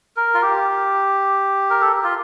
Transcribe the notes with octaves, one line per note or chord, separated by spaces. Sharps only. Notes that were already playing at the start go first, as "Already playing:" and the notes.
A#4
F4
G4
A#4
A4
G4
F4